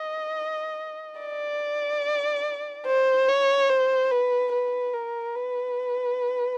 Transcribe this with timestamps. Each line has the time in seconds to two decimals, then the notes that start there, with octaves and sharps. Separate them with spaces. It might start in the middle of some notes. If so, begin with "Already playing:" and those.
Already playing: D#5
1.21 D5
2.86 C5
3.28 C#5
3.69 C5
4.11 B4
4.52 B4
4.93 A#4
5.35 B4